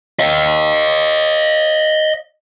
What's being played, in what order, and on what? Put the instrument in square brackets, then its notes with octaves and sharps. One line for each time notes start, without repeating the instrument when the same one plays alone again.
[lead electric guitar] D#5 F5